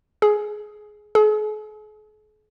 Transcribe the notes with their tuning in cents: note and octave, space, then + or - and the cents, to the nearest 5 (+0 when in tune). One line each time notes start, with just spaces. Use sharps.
G#4 +15
G#4 +45